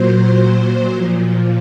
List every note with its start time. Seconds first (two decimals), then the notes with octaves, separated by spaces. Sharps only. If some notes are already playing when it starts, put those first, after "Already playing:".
Already playing: A#2 F#3 C5
0.90 A#2 F3